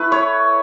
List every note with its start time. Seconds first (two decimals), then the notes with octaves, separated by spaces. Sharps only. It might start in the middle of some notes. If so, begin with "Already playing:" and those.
Already playing: A3 E4 B4
0.12 C#5